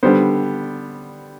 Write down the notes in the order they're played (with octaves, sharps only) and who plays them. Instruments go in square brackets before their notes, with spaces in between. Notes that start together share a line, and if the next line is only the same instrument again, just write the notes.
[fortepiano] D3 G3 B3 C5